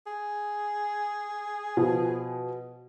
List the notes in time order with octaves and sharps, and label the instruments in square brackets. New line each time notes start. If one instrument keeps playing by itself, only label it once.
[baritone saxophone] G#4
[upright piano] B2 F3